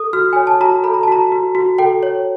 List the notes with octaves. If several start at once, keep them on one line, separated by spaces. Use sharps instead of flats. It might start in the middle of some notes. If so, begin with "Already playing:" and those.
Already playing: A4 D#6
F#4 F6
C#5 G#5
A5
F#4 A#5
A4 B5
A#5
A5
F#4 A#5
F#4
F#4
A4 G5
C#5